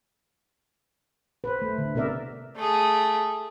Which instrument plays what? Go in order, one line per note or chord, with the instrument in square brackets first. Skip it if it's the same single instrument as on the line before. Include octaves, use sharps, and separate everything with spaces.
[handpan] B4 C5
A3
D3
C3 B3 A#4 D5 E5
[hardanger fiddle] A3 G#4